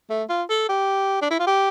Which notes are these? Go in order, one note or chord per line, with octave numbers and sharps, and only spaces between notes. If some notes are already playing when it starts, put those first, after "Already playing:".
A3
F4
A4
G4
D4
E4
F4
G4